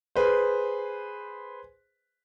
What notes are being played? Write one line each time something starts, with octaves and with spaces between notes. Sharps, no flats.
G#4 B4 C5